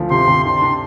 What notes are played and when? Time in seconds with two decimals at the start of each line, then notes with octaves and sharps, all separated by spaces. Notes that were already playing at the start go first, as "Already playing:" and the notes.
Already playing: D2 F3
0.11 C3 C6
0.28 C3
0.44 D4 C6
0.62 D4